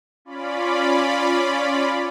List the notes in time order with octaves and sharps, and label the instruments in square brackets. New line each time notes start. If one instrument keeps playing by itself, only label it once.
[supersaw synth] C#4 F4 D5 B5